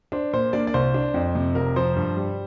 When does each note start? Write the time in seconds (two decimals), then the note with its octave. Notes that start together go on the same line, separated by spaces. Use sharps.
0.12 D4 C5
0.33 A#2 C5
0.53 A#3 D4 D5
0.67 D5
0.74 C2 C5
0.94 D4
1.14 F2
1.35 C3
1.55 F1 A#4
1.76 F3 C5
1.96 G2
2.17 G3